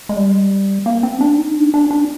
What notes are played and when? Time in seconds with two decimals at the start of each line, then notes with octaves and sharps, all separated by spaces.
0.09 G#3
0.16 G3
0.86 A#3
1.03 C4
1.21 D4
1.38 D#4
1.56 D4
1.74 D4
1.91 D4